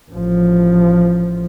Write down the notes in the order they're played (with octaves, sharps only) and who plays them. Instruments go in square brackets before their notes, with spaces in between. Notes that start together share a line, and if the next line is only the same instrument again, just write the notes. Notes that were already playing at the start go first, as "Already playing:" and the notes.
[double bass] A1 F3